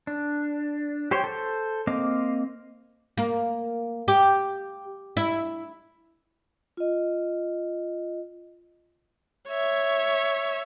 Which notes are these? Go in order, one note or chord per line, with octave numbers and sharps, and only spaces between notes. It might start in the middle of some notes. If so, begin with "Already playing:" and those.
D4
G4 C5 C#5 G5
A4 C5
A#3 C4 D#5 F5 D6
A#3
G4
E4
F4 D#5
C#5 E5